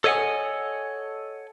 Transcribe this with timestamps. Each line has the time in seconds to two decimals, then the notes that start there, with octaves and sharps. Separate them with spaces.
0.04 A4 C#5 D#5 E5 F#5 G#5